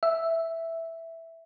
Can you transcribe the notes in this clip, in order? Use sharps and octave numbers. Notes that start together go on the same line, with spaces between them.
E5